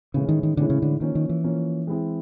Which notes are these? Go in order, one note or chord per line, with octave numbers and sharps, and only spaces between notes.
A2 C#3 E3 G#3 C#4 E4
D#3
D#3
A2 D3 E3 G#3 C#4 E4
C#3
D3
D#3 F3 A#3 C#4
D#3
E3
F3 A#3 C#4
G#3 C4 E4 G#4